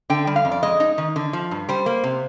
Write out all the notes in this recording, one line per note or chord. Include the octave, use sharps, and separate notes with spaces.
D3 G5
G3
F5
F2
D5
G#3 D#5
D#4
D#3
D3
F3
G2
G3 C5
A#3
C3